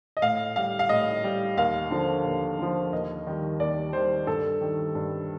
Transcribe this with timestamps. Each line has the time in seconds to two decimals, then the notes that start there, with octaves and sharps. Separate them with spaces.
0.17 D#5
0.22 A2 F5
0.56 G3 F5
0.79 F5
0.89 A2 D#5
1.24 G3
1.57 D#2 F5
1.91 D3 F3
2.24 D#2
2.58 D3 F3
2.92 D#2 D#5
3.27 D#3 G3
3.59 D#2 D5
3.93 D#3 G3 C5
4.27 G2 A4
4.61 D#3 G3
4.95 G2